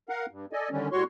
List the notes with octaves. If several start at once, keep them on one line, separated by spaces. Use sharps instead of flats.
A#4 F5 F#5
G2
A4 D5 D#5 G#5
D3 D#3 G3 C#4
A2 G3 F#4 C#5 C6 C#6